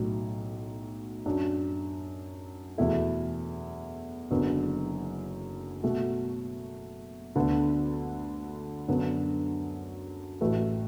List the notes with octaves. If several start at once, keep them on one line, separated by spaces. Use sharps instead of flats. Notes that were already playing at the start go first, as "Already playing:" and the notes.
Already playing: B1 A2 F#3
F#2 F#3 D4
E2 B2 A3 E4 A4
F#1 F#2 D3 B3
B2 A3 F#4
D2 D3 B3
F#2 D3 F#3 B3 D4
A1 A2 A3 F#4 B4